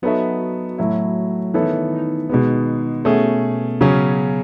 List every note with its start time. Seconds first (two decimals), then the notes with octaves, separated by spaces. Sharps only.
0.02 F#3 B3 D#4 F#4 A4 E5
0.78 A2 F#3 A3 E4
1.54 D#3 E3 B3 D#4 E4 A4 C#5
1.91 D#3 D#4
2.29 B2 G#3 B3
3.05 B2 A3 B3 C#4 G#4
3.81 C#3 F#3 C#4 G#4